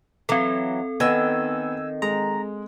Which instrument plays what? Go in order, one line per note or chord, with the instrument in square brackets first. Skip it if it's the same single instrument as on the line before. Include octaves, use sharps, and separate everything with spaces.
[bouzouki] E3 F#3 [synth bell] C4 A4
[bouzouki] D#3 [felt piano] B3 F#5 [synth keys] G#5 E6
[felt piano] G#3 [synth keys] A#5